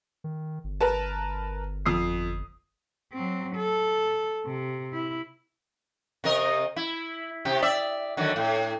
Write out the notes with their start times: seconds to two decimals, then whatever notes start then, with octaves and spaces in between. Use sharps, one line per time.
0.24 D#3
0.64 G1
0.81 A#4 B4 A5
1.86 F2 D#6 C7
3.13 F#3 C4
3.56 A4
4.46 C3
4.93 E4
6.24 C3 A#4 D#5
6.76 E4
7.45 C3 G4
7.62 D5 E5
8.17 D3 D#3 F#3
8.36 A2